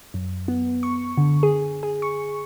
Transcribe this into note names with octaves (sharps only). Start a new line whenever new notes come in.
F#2
B3
C#6
D3
G#4
G#4
C#6